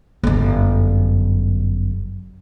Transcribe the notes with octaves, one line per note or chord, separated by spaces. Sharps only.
G1 F#2